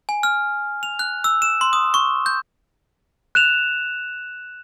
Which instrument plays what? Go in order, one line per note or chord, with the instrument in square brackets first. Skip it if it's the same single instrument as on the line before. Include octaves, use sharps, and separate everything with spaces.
[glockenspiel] G#5
F6
F7
F#6
E6
E7
C6
D#6
C#6
G6
F#6 E7 F7